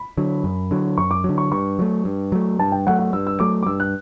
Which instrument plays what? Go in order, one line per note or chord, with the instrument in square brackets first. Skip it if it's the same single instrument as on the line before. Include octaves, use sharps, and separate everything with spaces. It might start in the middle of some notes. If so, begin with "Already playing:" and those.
Already playing: [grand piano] B5
[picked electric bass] D3 F#3
F#2
D3 F#3
[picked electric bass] F#2 [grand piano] C#6
[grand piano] D6
[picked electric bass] D3 F#3
[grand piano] C#6
[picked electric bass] G2 [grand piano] C#6
[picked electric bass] F#3 A3
G2
F#3 A3
[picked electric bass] G2 [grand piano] A5
[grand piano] G5
[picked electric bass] F#3 A3 [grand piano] F#5
[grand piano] F#5
[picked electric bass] G2 [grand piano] E6
[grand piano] E6
[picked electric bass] F#3 A3 [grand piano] D6
[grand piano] D6
[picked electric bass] G2 [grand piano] E6
[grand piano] F#6